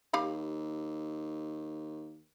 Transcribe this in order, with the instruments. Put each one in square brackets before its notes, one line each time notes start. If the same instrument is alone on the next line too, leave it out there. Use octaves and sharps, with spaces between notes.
[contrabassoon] D#2 [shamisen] G4 F5 B5